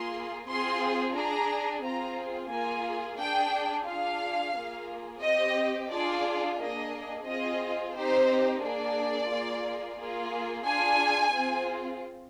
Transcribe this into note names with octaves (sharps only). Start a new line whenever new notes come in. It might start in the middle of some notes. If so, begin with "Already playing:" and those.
Already playing: A#3 F4 G#4 C6
C4 F4 G#4 C6
D4 G#4 A#5
C4 F4 G#4 A#5
A#3 F4 G#4 G#5
D4 G#4 G5
D4 F4 G#4 F5
A#3 F4 G#4
C4 G4 D#5
D4 F4 G#4 D5
A#3 D4 G#4 D#5
C4 F4 G#4 D#5
C4 D#4 G4 C5
A#3 D4 G#4 D5
A#3 F4 G#4
A#3 F4 G#4
D4 F4 G#4 G#5
C4 F4 G#4